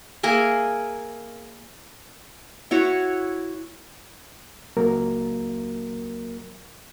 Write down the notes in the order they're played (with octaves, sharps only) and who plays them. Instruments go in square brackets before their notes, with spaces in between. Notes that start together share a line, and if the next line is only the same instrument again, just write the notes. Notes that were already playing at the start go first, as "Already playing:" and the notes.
[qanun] A#3 G#4 A#4 E5
E4 F#4 C#5
[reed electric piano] C#2 F#3 A#3 A#4